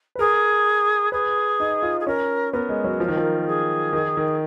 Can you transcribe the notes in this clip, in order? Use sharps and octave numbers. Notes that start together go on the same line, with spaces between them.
B4
G#4 A#4
G#4 B4
D#4
F4
G#4
C#4 A#4
B3 A#4
G#3
F#3
F3
D#3
F3
G#4
D#3
D#3